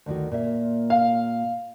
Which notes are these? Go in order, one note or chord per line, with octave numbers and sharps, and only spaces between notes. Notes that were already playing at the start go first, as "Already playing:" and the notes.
D2 D#3 F#4
A#2 A#3 E5
F5